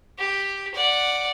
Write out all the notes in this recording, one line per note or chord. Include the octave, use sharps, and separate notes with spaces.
G4
D5 F#5